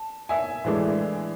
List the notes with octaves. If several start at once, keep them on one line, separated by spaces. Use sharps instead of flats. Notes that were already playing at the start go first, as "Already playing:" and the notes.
Already playing: A5
E5 G#5
A2 E3 G#3 D4